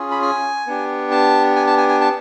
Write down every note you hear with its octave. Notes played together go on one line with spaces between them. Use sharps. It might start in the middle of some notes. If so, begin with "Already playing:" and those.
Already playing: C#4 F4 G#4
B5
G#5
B3 D4 G4
A5
G#5
A5
G#5
G#5
A5